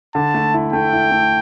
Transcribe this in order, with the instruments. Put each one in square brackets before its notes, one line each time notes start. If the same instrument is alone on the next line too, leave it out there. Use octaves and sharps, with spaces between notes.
[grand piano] D3 [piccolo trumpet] A5
[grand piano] A3
E4
[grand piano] A3 [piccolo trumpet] G5
[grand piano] E4
A3